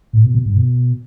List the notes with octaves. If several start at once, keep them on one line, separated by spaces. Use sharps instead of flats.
A2
B2
B2
G2
B2